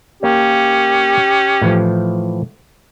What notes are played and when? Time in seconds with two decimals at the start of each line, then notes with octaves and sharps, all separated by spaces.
0.23 A#3 C#4 G4 C#5
1.62 A2 E3 F3